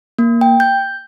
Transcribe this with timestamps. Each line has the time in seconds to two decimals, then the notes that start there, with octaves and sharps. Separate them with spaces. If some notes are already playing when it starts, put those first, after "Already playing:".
0.18 A#3
0.41 G5
0.60 G6